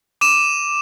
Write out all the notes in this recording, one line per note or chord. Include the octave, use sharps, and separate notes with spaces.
D6 D#7 E7